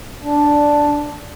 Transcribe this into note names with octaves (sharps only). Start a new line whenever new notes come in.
D4